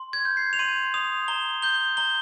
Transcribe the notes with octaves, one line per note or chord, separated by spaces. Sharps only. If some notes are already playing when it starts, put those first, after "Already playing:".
Already playing: C6
G#6
G6
C7
F7
C6 D#7
D#6 F7
A#5 G7
G6 G7
A#5 G7